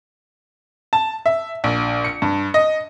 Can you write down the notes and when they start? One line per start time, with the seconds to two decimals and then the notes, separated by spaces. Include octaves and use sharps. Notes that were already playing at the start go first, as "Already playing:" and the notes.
0.93 A5
1.26 E5
1.64 A#1
2.04 C#7
2.22 G2
2.54 D#5